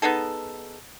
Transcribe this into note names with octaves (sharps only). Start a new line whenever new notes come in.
B3 D#4 G#4 A4